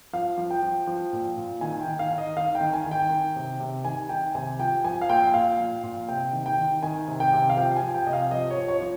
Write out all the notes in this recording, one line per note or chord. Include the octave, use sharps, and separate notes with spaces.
F3 F5
F3
G5
F3
F3
A#2
A#2
D#3 G#5
G5
D#3
F5
D#3
D#5
D#3 F5
G5
D#3
G#5
D#3
G5
D#3
C3
C3
D#3 G#5
D#3 G5
C3 G#5
F3 G5
F3 G#5
F5
A#2 G5
A#2 F5
F3
A#2
C3 G5
D#3
G5
D#3
D#3 G#5
C3
G5
C3
F5
F3 G5
G#5
F3
G5
C3 D#5
F5
F3 D#5
C#5
F3
C#5
F3